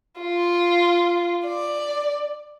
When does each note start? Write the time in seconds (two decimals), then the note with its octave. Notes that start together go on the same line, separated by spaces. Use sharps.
0.21 F4
1.46 D5